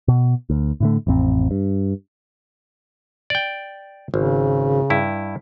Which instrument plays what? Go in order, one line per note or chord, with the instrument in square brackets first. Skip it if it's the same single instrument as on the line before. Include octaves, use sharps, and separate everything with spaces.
[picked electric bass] B2
D2
A2 D3 A3
A1 F2 C4
G2
[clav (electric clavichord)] D5 G5
[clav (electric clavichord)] G#1 [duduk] C#3
[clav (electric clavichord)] G2 E4